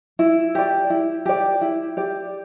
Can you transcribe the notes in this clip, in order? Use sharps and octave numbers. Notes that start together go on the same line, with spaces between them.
E4
G4 D5
E4
G4 D5
E4
G4 D5